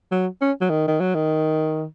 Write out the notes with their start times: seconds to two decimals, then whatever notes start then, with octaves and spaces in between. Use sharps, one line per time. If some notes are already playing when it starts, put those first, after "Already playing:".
0.11 F#3
0.41 C#4
0.61 F#3
0.70 D#3
0.88 D#3
1.00 F#3
1.15 D#3